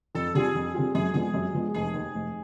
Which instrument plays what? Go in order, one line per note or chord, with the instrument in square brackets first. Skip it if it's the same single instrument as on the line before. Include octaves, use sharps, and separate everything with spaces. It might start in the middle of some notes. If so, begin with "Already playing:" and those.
[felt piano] F2 [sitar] A4
[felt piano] D3 G3 C4 F4 [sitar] G#4
[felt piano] F2
D3 G3 C4 F4
[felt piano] F#2 [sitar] G#4
[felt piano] D3 F3 G#3 B3 [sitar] G#4
[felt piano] F#2
D3 F3 G#3 B3
[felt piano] F1 [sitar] G#4
[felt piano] D#2 D#3
F1